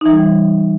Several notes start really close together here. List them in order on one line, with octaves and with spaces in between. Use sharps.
D#4 E3 G3